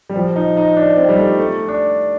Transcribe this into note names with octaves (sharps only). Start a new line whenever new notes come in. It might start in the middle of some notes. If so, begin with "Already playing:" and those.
G3
F3
D#4
D#4
D4
C4
G3
A3
A3
D4